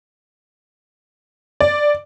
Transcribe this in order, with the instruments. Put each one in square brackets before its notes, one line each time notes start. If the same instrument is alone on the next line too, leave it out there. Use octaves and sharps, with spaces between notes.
[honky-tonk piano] D5